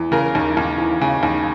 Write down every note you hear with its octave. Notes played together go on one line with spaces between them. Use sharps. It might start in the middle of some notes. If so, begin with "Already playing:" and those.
Already playing: E2
C#3 A#4
D#2
D#2
E3
C#3
D#2